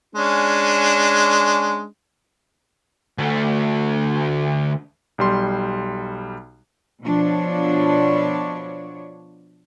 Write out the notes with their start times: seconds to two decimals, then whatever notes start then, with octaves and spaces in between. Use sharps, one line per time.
0.16 G#3 C#4 D4
3.18 D2 A3
5.18 B1 G3 C6
7.03 B2 F3 D4 C#5